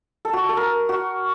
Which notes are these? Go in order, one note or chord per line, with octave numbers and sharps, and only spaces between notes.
A4
F#4
A4
A#4
F#4